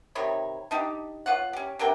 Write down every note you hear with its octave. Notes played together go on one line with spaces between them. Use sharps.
C3 D#3 C#5 B5
D4 D#4 G4
B3 F4 C#5 F#5
C#4 G4
C3 D4 A#4 G5